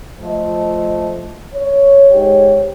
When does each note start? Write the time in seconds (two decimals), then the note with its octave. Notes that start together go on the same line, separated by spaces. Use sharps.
0.20 F3 A3 C5 D#5
1.53 C#5
2.10 G#2 G4 C#5